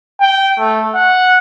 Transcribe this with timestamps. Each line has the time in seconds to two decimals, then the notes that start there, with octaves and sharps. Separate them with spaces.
0.21 G5
0.58 A3
0.95 F#5